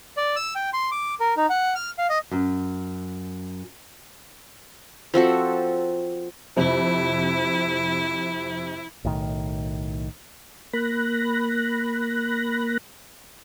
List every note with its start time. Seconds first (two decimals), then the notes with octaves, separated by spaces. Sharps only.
0.17 D5
0.36 E6
0.55 G5
0.73 C6
0.92 D6
1.20 A#4
1.37 D#4
1.50 F#5
1.75 F6
1.98 F5
2.10 D#5
2.31 F#2
5.14 F3 C4 F#4 A4
6.56 F2 C3 E4
9.04 B1 A2 D#3
10.73 A#3 B5 F#6 A#6